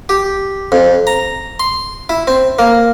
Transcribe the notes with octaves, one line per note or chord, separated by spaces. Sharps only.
G4
F2
A#5
C6
E4
C4
A#3